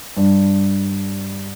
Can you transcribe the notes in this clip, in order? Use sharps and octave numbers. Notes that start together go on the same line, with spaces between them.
G2